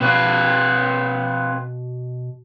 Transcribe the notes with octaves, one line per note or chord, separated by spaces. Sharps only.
B2 C4 B4 F5